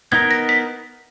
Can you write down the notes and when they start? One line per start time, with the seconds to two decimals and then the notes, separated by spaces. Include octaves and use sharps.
0.12 B3 D#4 A#4 G#6
0.31 A#6
0.49 B6